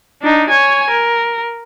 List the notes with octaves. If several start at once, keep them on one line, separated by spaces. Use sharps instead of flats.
D4 D#4
C#5 G#5
A#4